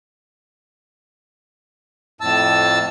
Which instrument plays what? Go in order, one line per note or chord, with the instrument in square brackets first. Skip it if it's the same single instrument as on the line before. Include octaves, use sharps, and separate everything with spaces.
[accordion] F2 A2 A5 E6